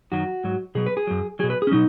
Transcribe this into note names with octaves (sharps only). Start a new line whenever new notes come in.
F#2 D#3 F#3 F#4
G#2 F#3
B2 F#3 G#4
B4
G#4
F#2 F#3
B2 F#3 G#4
B4
G#4
C#4
B2 F#3 D#4